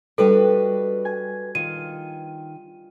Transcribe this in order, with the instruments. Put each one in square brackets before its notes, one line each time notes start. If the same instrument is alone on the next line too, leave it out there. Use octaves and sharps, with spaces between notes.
[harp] G3 D4 [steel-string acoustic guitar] F#4 B4 D#5 [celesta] A4
[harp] G#5
[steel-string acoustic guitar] D#3 [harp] F4 [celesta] D#7